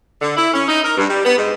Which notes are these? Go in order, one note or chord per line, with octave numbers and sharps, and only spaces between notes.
D3
E4
C#4
D#4
A#4
G2
G3
B3
G#2